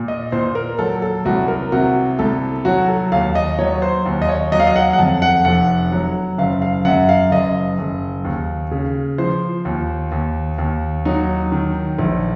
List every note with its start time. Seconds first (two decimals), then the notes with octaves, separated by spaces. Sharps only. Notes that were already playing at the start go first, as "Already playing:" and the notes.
Already playing: A#2
0.08 D#5
0.32 A#2 C5
0.55 A#4
0.79 F#3 A4
1.02 A4
1.25 C2 F#4
1.48 A#4
1.72 C3 F#4
2.19 C2 A4
2.65 F#3 F#4
2.88 A4
3.12 D#2 F5
3.35 D#5
3.59 F#3 C#5
3.82 C5
4.06 D#2
4.22 D#5
4.28 C#5
4.52 F#3 D#5
4.60 F5
4.67 D#5
4.76 F#5
4.93 F#5
4.98 F2 A5
5.22 F#5
5.45 F1 F#5
5.92 F#3
6.38 F#1 F5
6.62 F5
6.85 F#2 F#5
7.09 F5
7.31 F#1 D#5
7.79 F#1
8.25 D#2
8.72 C#3
9.18 F3 C5
9.65 D#2
10.12 D#2
10.58 D#2
11.05 F#3 D#4
11.52 D#3
11.99 A#1